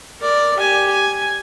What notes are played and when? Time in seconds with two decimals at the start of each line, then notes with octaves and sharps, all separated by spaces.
0.20 A#4 D5
0.57 G4 G#5
0.89 G#5